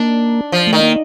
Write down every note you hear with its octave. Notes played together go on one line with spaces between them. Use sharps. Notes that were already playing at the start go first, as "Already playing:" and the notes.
Already playing: A#3 D4
F3
A3
D#3
A#3